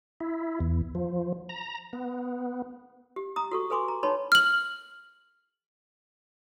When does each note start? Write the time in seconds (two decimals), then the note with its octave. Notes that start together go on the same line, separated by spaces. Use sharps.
0.20 E4
0.60 E2
0.95 F3
1.49 A#5
1.93 B3
3.16 G4
3.36 A#5 D#6
3.52 F#4 A4 C#6
3.70 A4 B4 G#5 C6 D6
3.88 A#5
4.03 D#4 B4 C#5 A5 B5 C6
4.32 F6 F#7